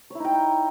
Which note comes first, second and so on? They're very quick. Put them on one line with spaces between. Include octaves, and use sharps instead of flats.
C#5 E4 D#4 G5